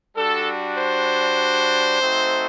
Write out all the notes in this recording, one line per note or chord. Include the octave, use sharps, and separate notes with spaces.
G3 D4 F#4 A4
C5
A3 C4 D#4 F#4